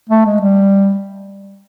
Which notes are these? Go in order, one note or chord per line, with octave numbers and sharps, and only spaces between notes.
A3
G#3
G3